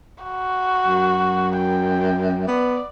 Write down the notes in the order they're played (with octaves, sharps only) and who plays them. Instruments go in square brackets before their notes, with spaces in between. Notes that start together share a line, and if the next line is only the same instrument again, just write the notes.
[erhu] F#4
[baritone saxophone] F#2
[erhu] G5
[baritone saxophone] B3 [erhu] D5